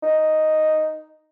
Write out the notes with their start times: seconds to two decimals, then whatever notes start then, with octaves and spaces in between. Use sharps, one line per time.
0.03 D#4